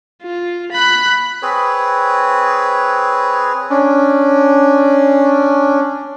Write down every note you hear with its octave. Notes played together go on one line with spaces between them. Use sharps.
F4
B5 F#6
C4 G#4 B4 C#5
C#4 D4